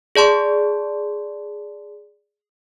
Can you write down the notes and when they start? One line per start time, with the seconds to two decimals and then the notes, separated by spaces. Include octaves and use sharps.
0.16 G#4 D5 A5 C6